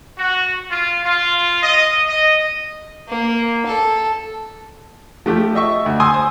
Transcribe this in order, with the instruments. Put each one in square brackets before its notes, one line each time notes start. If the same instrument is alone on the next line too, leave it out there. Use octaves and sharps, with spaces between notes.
[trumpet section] F#4
F4
F4
D#5
D#5
[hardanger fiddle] A#3
A4
[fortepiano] F3 A3 G4
D#5 E5 C#6
D2
G#5 C6 D#6 E6
C5